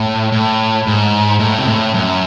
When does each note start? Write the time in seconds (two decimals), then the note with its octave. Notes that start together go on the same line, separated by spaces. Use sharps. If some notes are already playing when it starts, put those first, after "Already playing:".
Already playing: A2
0.32 A2
0.87 G#2
1.40 A2
1.58 C3
1.67 A2
1.94 F#2